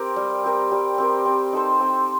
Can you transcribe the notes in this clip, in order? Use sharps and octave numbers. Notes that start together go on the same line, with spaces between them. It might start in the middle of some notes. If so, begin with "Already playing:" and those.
Already playing: C4 G4 A#4
G3
C4 G4 A#4
G3
C4 G4 A#4
C4
D#4 A4 C5
C4